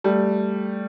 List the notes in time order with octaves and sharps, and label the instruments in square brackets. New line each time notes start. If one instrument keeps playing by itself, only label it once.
[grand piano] G3 A3